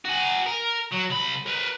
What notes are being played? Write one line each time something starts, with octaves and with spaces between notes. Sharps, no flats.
F#4 G#4
A#4
F#3
C2 B5
A#4 B4